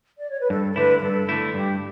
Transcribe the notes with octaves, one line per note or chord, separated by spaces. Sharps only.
D5
C#5
B4
G2 A4
A4
D3 A3 E4 B4
B4
G2 A4
D3 A3 E4
G2 G4